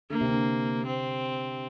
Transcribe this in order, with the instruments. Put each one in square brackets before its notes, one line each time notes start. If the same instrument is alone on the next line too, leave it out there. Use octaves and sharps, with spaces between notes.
[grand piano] D3 [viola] A#3
[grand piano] C3
D3
[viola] C4